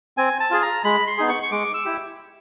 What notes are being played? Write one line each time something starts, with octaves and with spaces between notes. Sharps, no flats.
C4 G#5
A5
F4 G#4
A#5
G#3 B5
C6
B3 D#4 G#4
C#6
C#6
G#3 D6
E6
E4 G4